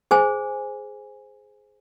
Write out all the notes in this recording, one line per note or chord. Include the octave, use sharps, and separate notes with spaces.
G#4 C5 G#5